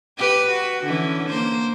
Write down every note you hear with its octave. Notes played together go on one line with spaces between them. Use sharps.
G4 B4
F#4
D3 E3 C#4
A#3 C5